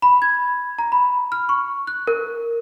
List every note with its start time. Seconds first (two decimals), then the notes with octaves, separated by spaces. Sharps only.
0.02 B5
0.22 G#6
0.79 A#5
0.92 B5
1.32 F6
1.49 C#6
1.87 F#6
2.07 A#4